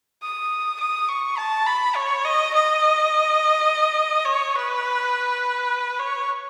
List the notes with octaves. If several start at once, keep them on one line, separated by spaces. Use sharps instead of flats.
D#6
D#6
C#6
A5
B5
C#5
D#5
D#5
C#5
B4
C#5